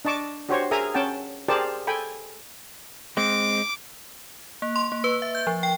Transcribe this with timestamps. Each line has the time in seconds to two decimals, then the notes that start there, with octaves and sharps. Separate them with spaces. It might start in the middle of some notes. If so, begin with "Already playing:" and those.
0.05 D4 D#5 A5 C#6 D6
0.49 D4 F#4 G4 C5 C#5
0.71 G#4 A#4 E5 G#5 A#5 D#6
0.94 C#4 F#5 G5 A5
1.49 G4 G#4 A#4 C5 D5 A5
1.87 A4 G5 G#5 B5
3.17 G#3 C4 D6
4.62 A#3
4.76 C6
4.92 A#3
5.04 B4
5.22 E5
5.35 G6
5.47 F3
5.63 G5